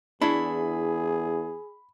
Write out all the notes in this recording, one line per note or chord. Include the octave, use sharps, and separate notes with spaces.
E2 D4 E4 G#4 C#5 B5